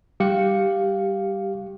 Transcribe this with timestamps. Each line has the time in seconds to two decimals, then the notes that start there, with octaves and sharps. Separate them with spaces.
0.20 G3 G4 F5 C#7